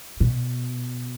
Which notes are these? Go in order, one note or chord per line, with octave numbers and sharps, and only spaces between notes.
B2